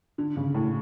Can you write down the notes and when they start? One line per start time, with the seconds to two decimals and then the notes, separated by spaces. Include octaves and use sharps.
0.18 D3
0.37 C#3
0.55 A2